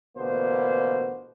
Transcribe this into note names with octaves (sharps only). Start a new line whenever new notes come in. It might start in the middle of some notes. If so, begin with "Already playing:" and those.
A1 B2 D3 A#3 B3 C5